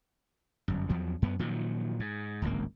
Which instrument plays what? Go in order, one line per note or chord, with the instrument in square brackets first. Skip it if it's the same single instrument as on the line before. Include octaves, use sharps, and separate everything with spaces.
[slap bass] G1 F#2
E2 F3 F#3
F#2 B3
A#2 D#3 F3 F#3
G#2
D1 G#1 C#2 A#3